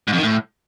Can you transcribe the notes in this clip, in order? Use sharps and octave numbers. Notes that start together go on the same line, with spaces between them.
G#2
F2
D#3
A2